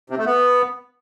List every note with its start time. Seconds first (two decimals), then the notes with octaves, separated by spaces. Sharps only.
0.10 C3
0.18 A3
0.26 B3